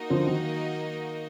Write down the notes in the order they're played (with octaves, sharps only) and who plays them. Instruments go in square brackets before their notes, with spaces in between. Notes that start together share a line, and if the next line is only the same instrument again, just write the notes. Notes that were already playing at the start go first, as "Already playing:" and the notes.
Already playing: [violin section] A#3 D#4 F#4 A#4 D#5
[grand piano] D3 F3
D#3 F#3